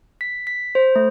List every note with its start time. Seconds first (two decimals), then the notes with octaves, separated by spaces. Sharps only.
0.21 B6
0.47 B6
0.75 C5
0.96 A3